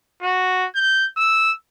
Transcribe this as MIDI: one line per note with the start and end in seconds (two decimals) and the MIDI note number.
0.22 0.66 66
0.75 1.06 91
1.17 1.52 88